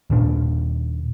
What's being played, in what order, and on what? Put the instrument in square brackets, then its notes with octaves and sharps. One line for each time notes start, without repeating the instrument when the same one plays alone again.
[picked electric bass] D#2 A#2 D4